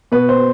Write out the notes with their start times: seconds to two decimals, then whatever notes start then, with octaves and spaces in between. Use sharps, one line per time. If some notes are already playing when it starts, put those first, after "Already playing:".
0.12 B2 B4
0.29 C5